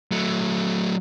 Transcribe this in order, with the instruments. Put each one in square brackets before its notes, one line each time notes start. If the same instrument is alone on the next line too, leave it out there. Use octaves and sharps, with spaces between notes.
[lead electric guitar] F#3 A3